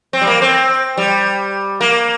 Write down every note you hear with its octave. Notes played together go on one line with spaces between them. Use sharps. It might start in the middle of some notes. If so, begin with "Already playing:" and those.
C4
G3
A#3
C4
G3
A#3